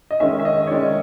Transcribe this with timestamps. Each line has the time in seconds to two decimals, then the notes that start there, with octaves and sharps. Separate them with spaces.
0.11 D#5
0.20 D#3 G#3 C#4 E5
0.40 E5
0.45 D#5
0.67 C#5
0.71 D#3 G#3 C#4 D5